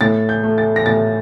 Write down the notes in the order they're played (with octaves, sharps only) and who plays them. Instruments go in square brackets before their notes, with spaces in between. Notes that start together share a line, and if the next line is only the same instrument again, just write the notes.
[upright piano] A2 A6
G6
A3
A6
A#6
A2 A6